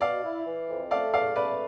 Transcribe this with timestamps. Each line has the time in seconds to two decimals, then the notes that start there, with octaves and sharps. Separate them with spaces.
0.01 B2 D5 F5
0.24 E4
0.47 E3
0.68 F2
0.91 A3 D5 F5
1.13 E2 D5 F5
1.36 A3 B4 D5